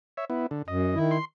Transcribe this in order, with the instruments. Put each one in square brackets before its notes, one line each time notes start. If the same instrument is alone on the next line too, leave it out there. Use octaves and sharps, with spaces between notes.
[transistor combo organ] C#5 E5
B3 E4
D3
[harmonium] F#2 [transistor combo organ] D#5
[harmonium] D#3 E4
[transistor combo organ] C6